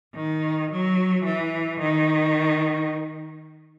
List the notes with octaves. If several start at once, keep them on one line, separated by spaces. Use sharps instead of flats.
D#3
F#3
E3
D#3